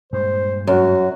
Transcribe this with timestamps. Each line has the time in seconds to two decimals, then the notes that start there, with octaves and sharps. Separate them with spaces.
0.13 G2 A#2 G#3 C5
0.67 F#2 F#4